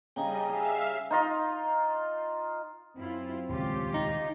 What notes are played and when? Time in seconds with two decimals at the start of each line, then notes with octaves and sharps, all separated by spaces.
0.16 C#3 G3 D#4 D#5 G5 G#5 A#5
0.49 G#4 E5 F5
1.11 D#4 F4 D#5
2.96 F#2 C4 E4 F4
3.49 D#1 C#2 C#4 F4 G4
3.94 D#4